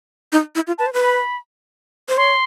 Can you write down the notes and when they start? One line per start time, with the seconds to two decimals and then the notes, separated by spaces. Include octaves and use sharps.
0.32 D#4
0.55 E4
0.67 F4
0.78 B4 A5
0.86 C5
0.93 B4
1.02 B5
2.09 C5
2.17 C#5 C6